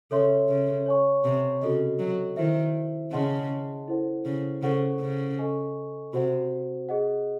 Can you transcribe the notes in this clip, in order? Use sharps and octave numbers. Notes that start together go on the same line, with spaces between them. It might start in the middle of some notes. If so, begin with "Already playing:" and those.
C#3 A4 C#5 E5 C6
C#3
C#5 G#5 C#6
C3
C#3 F#4 A4 D#5
F#3
D#3 E4 C5 E5
C#3 G#4 D#5 F#5 A5 C6
E4 A4 C5 F#5
C#3
C#3 A4 C5 F#5 C#6
C#3
A4 D#5 G#5 C#6
C3 F#4 C5 F#5
G#4 D#5 F#5